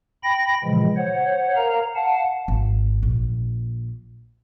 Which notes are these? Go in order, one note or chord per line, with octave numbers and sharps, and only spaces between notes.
G5 B5 A#6
A#2 C#3 E3 F3 G#3
C5 C#5 F#5
A#4 F5 A#5
F5 F#5 A5
G#1
A#1